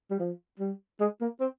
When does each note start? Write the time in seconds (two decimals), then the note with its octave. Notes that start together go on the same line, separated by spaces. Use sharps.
0.11 G3
0.20 F3
0.60 G3
1.00 G#3
1.21 A#3
1.41 C4